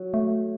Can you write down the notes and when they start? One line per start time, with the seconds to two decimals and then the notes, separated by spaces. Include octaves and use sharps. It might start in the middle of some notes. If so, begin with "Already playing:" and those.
Already playing: F#3
0.14 A3